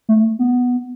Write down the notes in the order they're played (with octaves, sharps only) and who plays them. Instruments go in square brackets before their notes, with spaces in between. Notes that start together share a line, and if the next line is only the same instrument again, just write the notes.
[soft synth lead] A3
B3